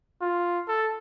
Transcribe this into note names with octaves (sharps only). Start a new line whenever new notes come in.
F4
A4